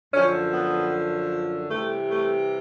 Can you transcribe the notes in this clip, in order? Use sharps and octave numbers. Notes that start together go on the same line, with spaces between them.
F#2 D3 F3 C#4
B3
C3 E3 G3 A3
A3